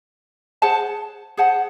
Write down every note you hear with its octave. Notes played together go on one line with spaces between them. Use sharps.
G#4 C5 F#5 A5
G#4 C5 F#5 A5